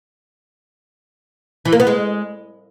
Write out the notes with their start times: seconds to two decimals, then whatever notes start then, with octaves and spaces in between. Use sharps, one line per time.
1.65 E3
1.73 A#3
1.80 B3
1.87 G#3